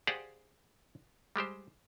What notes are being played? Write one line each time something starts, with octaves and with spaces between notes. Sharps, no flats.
G4 G#4 C5 D5 F5 F#5
G3 G#3 G4 C5